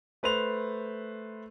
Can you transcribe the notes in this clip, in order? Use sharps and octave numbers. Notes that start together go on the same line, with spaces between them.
A3 B4 C5 F7